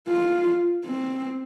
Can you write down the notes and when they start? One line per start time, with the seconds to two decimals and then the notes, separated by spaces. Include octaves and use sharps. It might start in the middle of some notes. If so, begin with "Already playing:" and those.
0.09 F4
0.85 C4